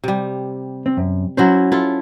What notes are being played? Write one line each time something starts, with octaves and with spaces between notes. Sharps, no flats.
C3 G3
C4
F#2
F#3 C#4 E4 C5
E4 F4 A4